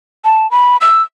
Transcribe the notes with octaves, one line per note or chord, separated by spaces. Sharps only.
A5
B5
E6